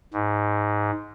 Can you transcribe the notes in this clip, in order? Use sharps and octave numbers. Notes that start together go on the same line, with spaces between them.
G#2